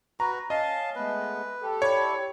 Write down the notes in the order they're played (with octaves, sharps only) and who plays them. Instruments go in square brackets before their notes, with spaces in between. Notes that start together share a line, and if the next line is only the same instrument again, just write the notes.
[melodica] F#4 B4 [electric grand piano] A#5
[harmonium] C#4 [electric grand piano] D#5 [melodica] F5 A5
[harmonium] G#3 A3 B3 [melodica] B4
[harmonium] G4 A4
[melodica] E4 D5 [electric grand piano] C#5